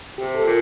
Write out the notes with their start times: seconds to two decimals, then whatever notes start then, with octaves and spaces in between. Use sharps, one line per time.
0.18 C3 G4
0.35 A4
0.44 A#2